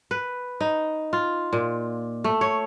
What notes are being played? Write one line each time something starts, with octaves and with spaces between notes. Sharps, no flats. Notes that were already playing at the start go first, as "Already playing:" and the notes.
B4
D#4
F4
A#2
A3
C#5